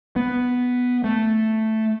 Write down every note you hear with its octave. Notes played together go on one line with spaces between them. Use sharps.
B3
A3